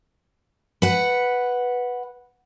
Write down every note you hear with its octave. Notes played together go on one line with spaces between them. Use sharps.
B4 F#5